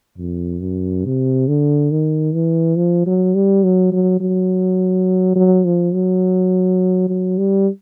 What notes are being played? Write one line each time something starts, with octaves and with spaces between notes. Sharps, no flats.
F2
F#2
C3
D3
D#3
E3
F3
F#3
G3
F#3
F#3
F#3
F#3
F3
F#3
F#3
G3